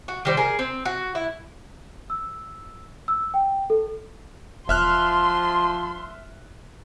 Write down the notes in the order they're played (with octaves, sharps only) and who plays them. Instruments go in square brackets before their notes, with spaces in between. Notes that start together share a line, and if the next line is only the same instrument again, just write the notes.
[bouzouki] F#4
D#3 G3 C5
G#4 A#4
C4
F#4
E4
[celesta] E6
E6
G5
A4
[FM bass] E1 [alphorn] F3 [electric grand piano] E5 F6 F#6 [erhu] C6